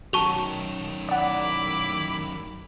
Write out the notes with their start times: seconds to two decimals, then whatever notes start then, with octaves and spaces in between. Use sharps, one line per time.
0.13 F#2 D#3 F#4 A5 C#6 F7
1.09 E4 D5 F#5 B5 D6